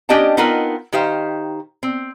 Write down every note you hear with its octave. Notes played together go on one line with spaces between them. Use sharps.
C#4 D4 G4 D#5 G5 A5
B3 C4 D#4 F4 A#4 B4
D#3 D#4 G4 C5 F5
C4